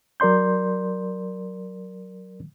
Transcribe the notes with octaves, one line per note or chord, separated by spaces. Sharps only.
F#3 A#4 D5 C6 G6